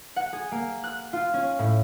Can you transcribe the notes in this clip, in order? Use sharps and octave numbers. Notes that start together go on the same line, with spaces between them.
F#5
G#4
A#3
F#6
F4
C#4
A2